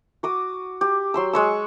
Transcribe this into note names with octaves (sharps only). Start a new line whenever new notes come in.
F#4 D6 D#6
G4
F#3 C6 E6
G#3 C#6 E6